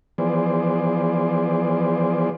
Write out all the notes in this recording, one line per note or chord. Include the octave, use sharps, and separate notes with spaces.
E3 F3 B3 G#4 C5 D5